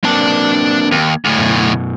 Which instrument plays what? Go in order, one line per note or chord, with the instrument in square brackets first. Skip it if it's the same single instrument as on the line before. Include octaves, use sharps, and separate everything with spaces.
[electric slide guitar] F#3 A#3 C4 [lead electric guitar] D4 A5
[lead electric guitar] D#2
D2 A2
[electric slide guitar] F#2 B2